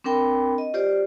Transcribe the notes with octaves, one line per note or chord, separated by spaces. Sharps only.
C4 D4 A#4 G5 B5
D#5
F4 G4 C5 D5